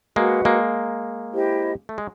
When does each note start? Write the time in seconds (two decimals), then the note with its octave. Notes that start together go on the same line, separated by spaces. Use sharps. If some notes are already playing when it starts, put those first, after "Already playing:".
0.16 G#3 A#3 F#4 B4 D#5 F#5
0.45 G#3 A#3
1.32 E4 G4 C5 D#5
1.89 A3
1.98 G#3